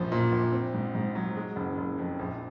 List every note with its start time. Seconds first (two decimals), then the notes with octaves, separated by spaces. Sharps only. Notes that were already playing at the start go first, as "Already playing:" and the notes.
Already playing: A#1 F#2 F3
0.12 A#2
0.32 A#1
0.52 C4
0.74 G#2
0.95 G#2
1.15 F#3
1.36 G#3
1.56 F#1
1.78 F#1
1.98 F2
2.19 A#1